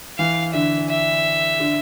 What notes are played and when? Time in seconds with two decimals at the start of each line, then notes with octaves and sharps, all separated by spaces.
0.18 E3 F5
0.54 D3 E5
0.89 E5
1.60 D3